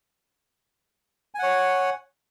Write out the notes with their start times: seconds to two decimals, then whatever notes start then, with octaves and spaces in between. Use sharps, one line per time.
1.35 G#5
1.39 F#5
1.43 C#5